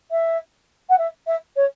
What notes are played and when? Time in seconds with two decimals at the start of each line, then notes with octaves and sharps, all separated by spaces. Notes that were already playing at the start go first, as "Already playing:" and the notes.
0.11 E5
0.89 F#5
0.98 E5
1.27 E5
1.56 C#5